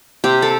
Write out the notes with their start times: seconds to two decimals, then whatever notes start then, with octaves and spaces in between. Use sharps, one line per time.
0.24 C3 G4
0.42 A4